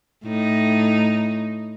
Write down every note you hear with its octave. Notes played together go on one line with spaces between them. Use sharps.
A2 D#4